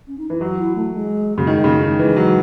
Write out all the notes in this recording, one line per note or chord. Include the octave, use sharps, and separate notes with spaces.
C#4
D#4
E3 E4
F#3 F#4
E4
A3
G#3
C#3 F#3
D#3 G#3
C#3 F#3
G#3
D#3
E3 G#3
F#3